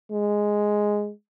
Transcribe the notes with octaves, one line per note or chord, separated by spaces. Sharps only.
G#3